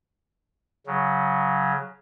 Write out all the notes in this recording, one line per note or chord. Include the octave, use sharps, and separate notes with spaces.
C#3 F#3